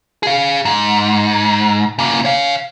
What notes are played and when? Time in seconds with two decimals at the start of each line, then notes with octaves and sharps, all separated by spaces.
0.23 G#4 F5
0.65 G#2
1.99 C#3 A#3
2.25 C#5 F5